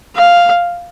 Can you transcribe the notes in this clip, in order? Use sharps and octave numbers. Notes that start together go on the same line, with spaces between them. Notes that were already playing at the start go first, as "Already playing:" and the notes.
F5